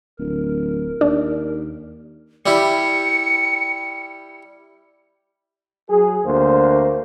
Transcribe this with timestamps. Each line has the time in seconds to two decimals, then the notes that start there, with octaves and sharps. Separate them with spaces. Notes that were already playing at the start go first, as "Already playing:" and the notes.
0.19 D1 A#4
1.01 D#2 D4
2.46 G3 E4 G4 C#7
5.89 F#3 G#4
6.24 D2 A#3 C5